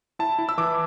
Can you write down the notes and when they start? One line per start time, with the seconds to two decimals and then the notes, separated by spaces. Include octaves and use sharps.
0.19 E4 A5
0.39 E4
0.49 E6
0.58 E3 D6